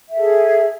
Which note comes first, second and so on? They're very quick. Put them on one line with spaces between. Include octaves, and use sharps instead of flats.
E5 A4 G#4